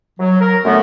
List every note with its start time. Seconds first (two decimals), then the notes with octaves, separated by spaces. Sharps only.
0.20 F#3
0.40 A#4
0.65 F#2 D3 A3 B3